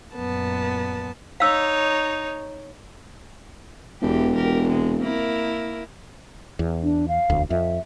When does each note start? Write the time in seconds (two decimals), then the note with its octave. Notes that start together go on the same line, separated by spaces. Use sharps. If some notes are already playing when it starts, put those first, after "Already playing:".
0.14 F#2 A#2 B3 A5
1.40 D#4 C#5 F5 E6
4.02 E1 E2 G4
4.36 G4 A#4
4.69 C3 G#3
5.00 A#3 E4 A#4
6.59 E2
6.83 D4
7.08 F5
7.30 E1 D2
7.50 F2 E5